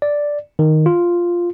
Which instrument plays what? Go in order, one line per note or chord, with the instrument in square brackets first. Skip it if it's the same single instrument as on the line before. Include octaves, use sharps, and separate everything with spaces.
[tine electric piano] D5
D#3
F4